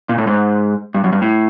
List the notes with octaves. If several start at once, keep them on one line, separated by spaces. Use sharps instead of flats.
A#2
A2
G#2
G2
F#2
G2
A2